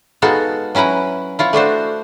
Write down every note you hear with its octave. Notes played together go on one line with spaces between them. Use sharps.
G#3 B3 D#4 F#4 A4 F5
F#3 C#4 E4 B4 A#5
E4 F4 C#5
A3 D4 F#4 C5